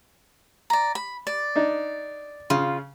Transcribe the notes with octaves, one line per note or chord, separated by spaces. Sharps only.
D5 A#5
B5
D5
D4 D#4
C#3 F4